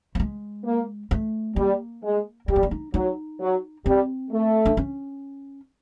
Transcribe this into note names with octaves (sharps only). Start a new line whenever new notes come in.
A3
G#3
A#3
A3
G3 A#3
G#3
G3 A3
A#3
A3
D#4
F#3 D#4
F#3
G3 C4
A3
D4
C#4